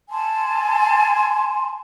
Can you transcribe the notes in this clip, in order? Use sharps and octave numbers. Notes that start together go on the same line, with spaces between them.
G#5 A5 C6